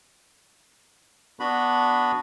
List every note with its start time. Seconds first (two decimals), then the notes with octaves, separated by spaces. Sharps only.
1.40 B3 D4 F#4 B5